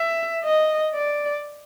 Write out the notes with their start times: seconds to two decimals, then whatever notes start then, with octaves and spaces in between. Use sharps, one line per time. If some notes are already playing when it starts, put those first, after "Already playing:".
Already playing: E5
0.44 D#5
0.95 D5